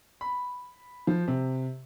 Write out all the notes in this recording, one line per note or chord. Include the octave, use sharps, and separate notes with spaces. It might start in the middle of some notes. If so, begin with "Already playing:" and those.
B5
F3
C3